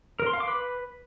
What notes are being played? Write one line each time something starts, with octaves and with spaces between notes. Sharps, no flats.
A#4
C6
F5
D6
B4